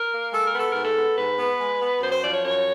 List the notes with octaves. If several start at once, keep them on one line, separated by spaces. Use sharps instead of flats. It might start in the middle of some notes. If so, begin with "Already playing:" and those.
Already playing: A#4
A#3
G#3 A4
A#4
B3
A4
G#2 A#4
A4
B3
G#2 B4
B3
G#3
B3
F#2 C5
C5
F3 D5
C#5
F#2 C#5